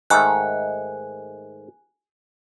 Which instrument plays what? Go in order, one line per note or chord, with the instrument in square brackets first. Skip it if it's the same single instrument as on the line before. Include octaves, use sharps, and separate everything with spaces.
[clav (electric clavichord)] G#2 D#3 A3 [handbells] G#5 F#6